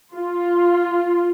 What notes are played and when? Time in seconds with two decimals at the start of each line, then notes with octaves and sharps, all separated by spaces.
0.15 F4